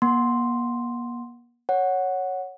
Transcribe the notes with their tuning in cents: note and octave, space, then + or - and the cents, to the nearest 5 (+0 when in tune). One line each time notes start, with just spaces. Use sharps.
A#3 +45 F#5 +0 C6 +0
C#5 +0 F#5 +0